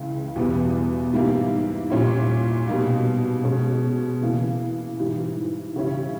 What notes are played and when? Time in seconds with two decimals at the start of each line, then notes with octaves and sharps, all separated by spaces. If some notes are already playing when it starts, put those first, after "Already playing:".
Already playing: C#2 C#3 E3
0.36 E2 B2 G3 B3
1.13 G#2 G3 A#3 E4
1.90 A#2 G3 C#4 E4
2.67 B2 G3 A#3 D#4
3.44 B2 G#3 C#4
4.21 C#3 E3 A#3
4.98 G#2 E3 G3
5.76 C#3 G3 C#4 E4